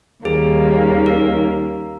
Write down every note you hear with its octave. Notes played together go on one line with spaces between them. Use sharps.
D#2 D#3 G3 A#3 C#4 G#4
A#4